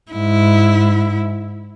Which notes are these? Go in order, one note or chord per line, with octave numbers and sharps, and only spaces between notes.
G#2 E4